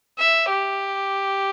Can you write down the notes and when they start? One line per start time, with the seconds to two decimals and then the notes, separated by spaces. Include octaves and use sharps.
0.19 E5
0.50 G4